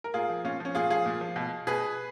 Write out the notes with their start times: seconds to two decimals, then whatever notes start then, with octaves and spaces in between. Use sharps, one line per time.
0.04 A#4
0.14 A#2 F4 G#4
0.29 F3
0.44 A#2 C#4 F4
0.60 F3 C#4
0.75 A#2 F4 G#4
0.90 F3 F4 G#4
1.06 A#2
1.21 F3
1.36 B2
1.67 B2 G#4 B4